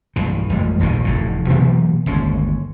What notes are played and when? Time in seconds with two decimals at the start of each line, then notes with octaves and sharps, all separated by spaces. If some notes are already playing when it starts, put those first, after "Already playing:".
0.16 B1 G2 E3
0.50 A1 F2 G3 G#3
0.80 D#1 A#1 G#2 D#3
1.04 F1 E2 A2
1.49 B2 E3 F#3 A#3
2.06 G1 D#2 G#3 C#4